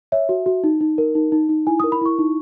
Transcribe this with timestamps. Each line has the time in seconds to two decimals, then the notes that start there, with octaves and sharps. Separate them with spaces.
0.12 C#5 E5
0.29 F#4
0.46 F#4
0.64 D#4
0.81 D#4
0.98 A#4
1.15 D#4
1.32 D#4
1.49 D#4
1.67 E4 G#5
1.80 D#6
1.84 A#4
1.92 B5
2.01 E4 C#6
2.19 D#4